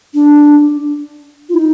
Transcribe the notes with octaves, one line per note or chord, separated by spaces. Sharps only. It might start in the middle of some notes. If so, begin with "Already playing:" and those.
D4
F4
D#4